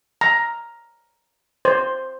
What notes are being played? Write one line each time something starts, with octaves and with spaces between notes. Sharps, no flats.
A#5
C5